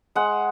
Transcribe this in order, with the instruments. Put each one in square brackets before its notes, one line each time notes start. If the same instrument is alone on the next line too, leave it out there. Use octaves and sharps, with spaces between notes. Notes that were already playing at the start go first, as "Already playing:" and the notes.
[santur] G#3 F#5